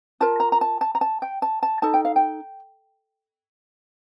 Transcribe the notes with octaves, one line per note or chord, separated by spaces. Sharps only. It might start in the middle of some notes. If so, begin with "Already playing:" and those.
F4 A#4 A5
A#5
A#5
A5
A5
A#5
A5
G5
A5
A5
D#4 A4 A5
G5
F5
G5